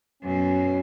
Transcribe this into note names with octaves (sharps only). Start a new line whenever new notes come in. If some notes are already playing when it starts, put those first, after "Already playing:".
F#2 B2 C#4